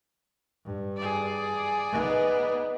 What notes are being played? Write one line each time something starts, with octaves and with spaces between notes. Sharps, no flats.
G2
G#4 D5
B3 D#4